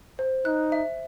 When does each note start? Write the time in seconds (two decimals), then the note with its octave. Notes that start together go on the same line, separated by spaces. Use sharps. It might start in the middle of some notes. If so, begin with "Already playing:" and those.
0.19 C5
0.45 D#4 F#6
0.72 E5